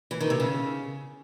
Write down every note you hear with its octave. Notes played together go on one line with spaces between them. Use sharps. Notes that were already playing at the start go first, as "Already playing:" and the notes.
E3
D#3
C3
C#3